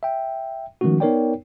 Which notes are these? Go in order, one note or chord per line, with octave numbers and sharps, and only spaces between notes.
E5 G5
D#3 F3 G#3 A3 C#4 F#4
B3 D#4 A#4 C#5 D5 G5